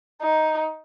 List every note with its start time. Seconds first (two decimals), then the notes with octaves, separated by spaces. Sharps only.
0.21 D#4